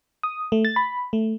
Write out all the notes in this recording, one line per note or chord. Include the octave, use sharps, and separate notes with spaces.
D#6
A3
A6
B5
A3